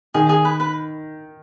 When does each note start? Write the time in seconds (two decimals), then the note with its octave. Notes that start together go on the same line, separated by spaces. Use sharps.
0.14 D#3 G#4
0.29 G#4
0.45 B4
0.60 B4